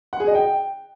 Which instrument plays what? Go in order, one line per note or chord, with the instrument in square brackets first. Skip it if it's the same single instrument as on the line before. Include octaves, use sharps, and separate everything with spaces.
[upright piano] F#5
G#4
D#5
G5